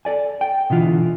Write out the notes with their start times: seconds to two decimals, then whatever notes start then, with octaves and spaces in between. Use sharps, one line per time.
0.05 A4 D5 G#5
0.41 G5
0.70 B2 D3 E3 F4